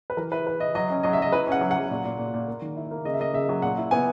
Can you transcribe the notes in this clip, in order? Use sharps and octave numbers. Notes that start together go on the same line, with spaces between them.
B4
E3 A#4
E4 B4
E4 B4
E4 D#5
F#3 D#5
C#4
F#3 D#5
E5
F#3 D#5
E4 B4
C#4 F#5
F#3
F#5
F#3
A#2
A#2
A#2
A#2
A#3
D#3
E4
A#3
C#3 D#5
E5
A#3 D#5
C#3 E5
F#3
A#2 F#5
E4
B3 G#5